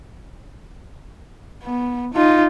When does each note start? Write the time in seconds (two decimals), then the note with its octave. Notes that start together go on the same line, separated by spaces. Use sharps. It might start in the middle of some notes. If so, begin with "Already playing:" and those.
1.63 B3
2.14 D#4 F4